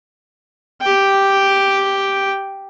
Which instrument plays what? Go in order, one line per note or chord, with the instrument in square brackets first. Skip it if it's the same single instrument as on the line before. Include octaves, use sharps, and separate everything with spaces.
[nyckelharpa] G4 G5